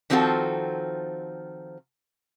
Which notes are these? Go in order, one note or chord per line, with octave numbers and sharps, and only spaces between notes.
D#3 F3 C4 F4 F#4 A4